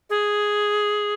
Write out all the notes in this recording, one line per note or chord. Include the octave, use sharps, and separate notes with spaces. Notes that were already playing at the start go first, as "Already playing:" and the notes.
G#4